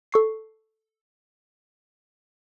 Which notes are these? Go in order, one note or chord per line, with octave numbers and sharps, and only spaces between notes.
A4 C#6 C7